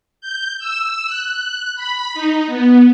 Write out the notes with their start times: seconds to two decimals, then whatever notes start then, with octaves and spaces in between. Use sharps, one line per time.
0.21 G6
0.59 E6
1.07 F#6
1.75 B5
2.14 D#4
2.47 B3